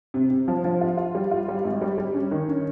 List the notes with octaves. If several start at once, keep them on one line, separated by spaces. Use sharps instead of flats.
C3
C3
F3
F3
F4
F4
G3
F4
G3
G#1
G3
G3
C#4
D#3
C#4